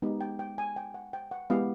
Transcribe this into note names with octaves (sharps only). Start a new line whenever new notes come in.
G#3 B3 D#4 G4
G5
G5
G#5
G5
F#5
G5
F#5
G#3 B3 E4 G4 F5